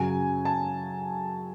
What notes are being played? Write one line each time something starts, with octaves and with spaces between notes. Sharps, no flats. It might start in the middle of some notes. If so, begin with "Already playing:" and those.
Already playing: F#2 C#3 F#3 G#5
A5